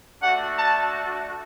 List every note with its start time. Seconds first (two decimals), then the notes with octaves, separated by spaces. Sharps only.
0.22 A3 D4 F#4 F#5
0.57 A5